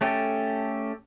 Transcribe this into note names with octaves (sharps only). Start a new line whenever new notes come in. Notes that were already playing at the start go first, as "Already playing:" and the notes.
A3 C#4 G4 A4